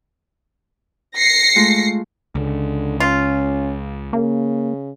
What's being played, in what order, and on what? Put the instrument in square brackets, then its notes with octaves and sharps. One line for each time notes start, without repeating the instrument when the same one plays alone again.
[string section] A#6 C7 C#7
[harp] G#3 A3 F4
[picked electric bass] C#2 [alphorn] D3
[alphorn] C#4 [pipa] F4
[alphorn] C#3 [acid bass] A#3